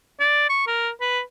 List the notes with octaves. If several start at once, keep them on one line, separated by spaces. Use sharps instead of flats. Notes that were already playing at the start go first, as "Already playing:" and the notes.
D5
C#6
A#4
B4